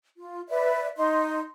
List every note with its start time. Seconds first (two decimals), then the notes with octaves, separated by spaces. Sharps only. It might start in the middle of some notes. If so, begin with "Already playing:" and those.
0.16 F4
0.48 B4 D5 E5
0.97 D#4 C6